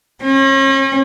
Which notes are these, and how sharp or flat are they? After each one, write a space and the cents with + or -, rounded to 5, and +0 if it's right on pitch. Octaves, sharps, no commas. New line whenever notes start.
C#4 -40